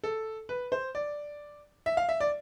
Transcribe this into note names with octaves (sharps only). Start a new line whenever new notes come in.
A4
B4
C5
D5
E5
F5
E5
D5